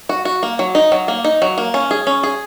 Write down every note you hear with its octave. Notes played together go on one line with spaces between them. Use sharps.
F#4
F#4
A#3
F#3
D#4
F#3
A#3
D#4
F#3
A#3
C#4
G#4
C#4
G#4